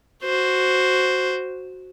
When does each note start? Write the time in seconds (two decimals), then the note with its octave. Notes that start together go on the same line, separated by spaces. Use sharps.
0.24 F#4 C5